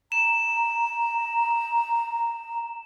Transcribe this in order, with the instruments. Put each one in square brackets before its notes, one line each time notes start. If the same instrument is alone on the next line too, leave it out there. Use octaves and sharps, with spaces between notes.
[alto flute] A#5 [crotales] E7